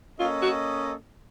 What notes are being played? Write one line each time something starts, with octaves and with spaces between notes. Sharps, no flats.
A#3 C#4 F4 A4 D#5
F#4